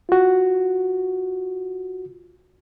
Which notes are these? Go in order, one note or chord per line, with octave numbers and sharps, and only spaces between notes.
F4 F#4